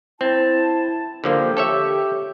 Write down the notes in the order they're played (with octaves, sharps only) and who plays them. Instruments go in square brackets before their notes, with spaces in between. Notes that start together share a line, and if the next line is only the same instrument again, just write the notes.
[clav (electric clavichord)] C4 [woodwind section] E4 A5
[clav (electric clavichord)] D3 F3 A#3 [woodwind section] G4
[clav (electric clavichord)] A4 C#5 E5